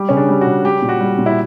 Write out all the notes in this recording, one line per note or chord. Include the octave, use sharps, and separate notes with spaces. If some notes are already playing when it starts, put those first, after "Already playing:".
Already playing: G3 G4
C#3 C#4
D4
G3
F#4
C#3
G3 G4
A#2
F#4
G3
A#2
E4